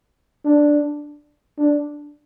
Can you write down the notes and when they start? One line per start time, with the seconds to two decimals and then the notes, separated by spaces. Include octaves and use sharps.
0.45 D4
1.58 D4